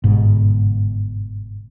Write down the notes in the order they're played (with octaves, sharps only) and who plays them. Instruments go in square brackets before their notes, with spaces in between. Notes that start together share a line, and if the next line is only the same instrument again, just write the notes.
[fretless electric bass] G1 G#2 B2